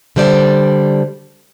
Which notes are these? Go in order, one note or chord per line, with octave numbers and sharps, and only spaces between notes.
D3 G3 C5 D5